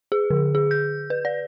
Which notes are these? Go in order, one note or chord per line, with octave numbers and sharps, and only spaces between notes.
G#4
D3
G#4
G6
B4
D5